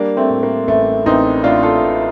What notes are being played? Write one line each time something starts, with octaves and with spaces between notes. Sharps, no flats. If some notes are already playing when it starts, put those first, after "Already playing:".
Already playing: G3 A#3 D4
A3 C4
A2
A#3
A1 A3
A1 C4 D#4
A2 D4 F4
F4 A4
A2